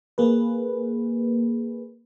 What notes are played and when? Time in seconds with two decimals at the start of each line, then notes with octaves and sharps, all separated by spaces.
0.18 A#3 G#4 B4